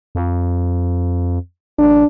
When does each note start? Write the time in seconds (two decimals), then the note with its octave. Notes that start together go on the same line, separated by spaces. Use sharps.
0.15 F2
1.79 A1 D4